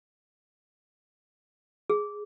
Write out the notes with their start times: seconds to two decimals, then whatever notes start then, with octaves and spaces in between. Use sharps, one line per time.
1.90 G#4